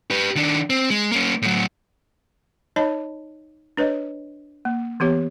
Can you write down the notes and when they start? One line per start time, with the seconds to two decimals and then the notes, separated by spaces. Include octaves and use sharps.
0.10 G4 B4
0.36 D#3 D4
0.70 C4
0.90 G#3
1.12 A#3 C#4
1.42 A2 F#3
2.76 D#4 C#5 D#5 A5 B5
3.77 D4 B4 C#5 D#5
4.65 A#3
5.00 E3 B3 G4 C#5